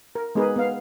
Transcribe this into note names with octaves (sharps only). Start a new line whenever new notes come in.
A#4
G#3 B3 D#4 G#4 A#4 B4
B3 F5